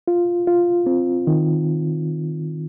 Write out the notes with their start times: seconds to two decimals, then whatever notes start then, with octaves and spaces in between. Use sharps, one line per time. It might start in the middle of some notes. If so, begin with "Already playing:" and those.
0.08 F4
0.47 F4
0.86 C4
1.27 D#3